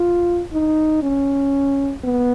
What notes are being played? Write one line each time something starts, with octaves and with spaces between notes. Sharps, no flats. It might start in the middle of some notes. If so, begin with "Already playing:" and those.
Already playing: F4
D#4
C#4
B3